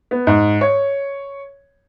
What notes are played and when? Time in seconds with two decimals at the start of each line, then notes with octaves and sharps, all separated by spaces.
0.11 B3
0.27 G#2
0.61 C#5